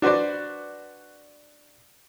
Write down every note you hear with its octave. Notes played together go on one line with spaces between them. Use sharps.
D4 F#4 B4 C5 D5